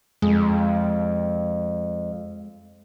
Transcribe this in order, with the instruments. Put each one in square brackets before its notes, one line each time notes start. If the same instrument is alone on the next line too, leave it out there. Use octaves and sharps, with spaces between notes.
[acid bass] F2 [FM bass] G#3